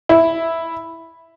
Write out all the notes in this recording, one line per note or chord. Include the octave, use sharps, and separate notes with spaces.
E4